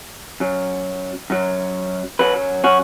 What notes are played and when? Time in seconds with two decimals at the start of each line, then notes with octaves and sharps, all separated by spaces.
0.40 F#2 F#3
1.30 F#2 F#3
2.19 F#2 F#3 F#4 B4
2.64 C#4 F#4